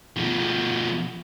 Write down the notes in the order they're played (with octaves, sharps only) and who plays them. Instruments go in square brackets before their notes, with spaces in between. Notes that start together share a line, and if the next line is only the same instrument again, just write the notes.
[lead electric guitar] B2 F3